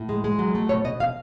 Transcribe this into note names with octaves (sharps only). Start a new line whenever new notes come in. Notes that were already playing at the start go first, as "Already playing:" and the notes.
Already playing: A2
G#3
G#3
F#3
A3
B2 C#5
B2 D#5
F5